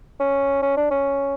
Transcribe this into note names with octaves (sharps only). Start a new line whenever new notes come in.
C#4
C#4
D4
C#4